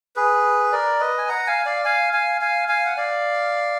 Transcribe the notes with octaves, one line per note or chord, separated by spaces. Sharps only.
G#4 B4
A#4 D5
B4 D#5
G#5
F#5 A#5
F5 G#5
D5 F5
F5 G#5
F5 G#5
F5 G#5
F5 G#5
F#5
D5 F5